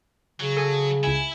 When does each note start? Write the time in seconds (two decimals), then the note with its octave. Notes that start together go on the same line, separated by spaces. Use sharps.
0.40 C#3 F#3
0.57 A4 G#5 D#6
1.04 C#2 E4 G#5